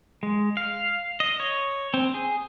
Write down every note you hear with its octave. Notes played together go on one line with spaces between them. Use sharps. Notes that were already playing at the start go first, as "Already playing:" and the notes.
G#3
F5
D#5
C#5
C4
G#4